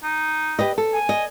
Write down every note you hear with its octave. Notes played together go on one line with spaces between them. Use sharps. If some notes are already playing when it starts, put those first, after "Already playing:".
D#4
G4 B4 D#5
A4
G#5
D#5